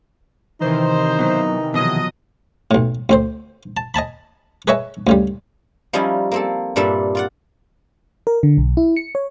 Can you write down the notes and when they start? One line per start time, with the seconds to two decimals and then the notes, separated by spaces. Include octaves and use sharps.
0.61 C3 D#3 E3 D#4 C5
1.19 B2 F#3
1.74 B2 F3 F#3 D#5
2.71 B1 A2
3.09 D2 C4 C5
3.77 A5
3.94 D#5 G#5 A5 B5
4.67 G#4 B4 C#5 D#5 E5 G#5
5.07 D2 C#3 G3
5.93 F3 G3 C#4 D#4 E4 G#5
6.31 A#3 C4 A4
6.76 G2 A#2 G3 D4 A4 E5
7.15 F4 D5 F#5
8.27 A#4
8.43 D3
8.58 B1
8.77 E4
8.97 C#7
9.15 C#5